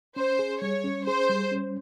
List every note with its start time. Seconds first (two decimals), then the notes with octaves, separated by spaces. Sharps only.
0.16 C#4 C5
0.39 G#4
0.62 G3 C#5
0.84 C#4
1.06 G#4 C5
1.29 G3
1.51 C#4